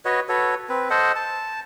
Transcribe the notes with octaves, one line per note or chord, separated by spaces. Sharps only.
F#4 B4 C#5 D#5
F#4 A4 B4 C#5
C4 B4
A4 C5 D#5 F#5
A5